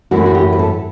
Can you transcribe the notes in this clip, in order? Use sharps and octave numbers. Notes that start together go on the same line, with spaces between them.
F#2 E3 A3 E4 F#4
F#4
G4
B4
A4